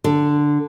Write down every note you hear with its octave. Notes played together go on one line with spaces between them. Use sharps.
D3